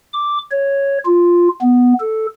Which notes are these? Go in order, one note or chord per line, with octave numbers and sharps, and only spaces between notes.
D6
C#5
F4
B3
A4